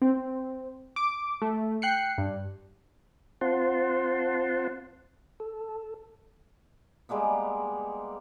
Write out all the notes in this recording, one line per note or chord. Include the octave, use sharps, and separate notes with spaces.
C4
D6
A3
G5 F#6 C7 C#7
G2
C4 F4 C5 F#5 A5 C6
A4
G3 G#3 A#3 B3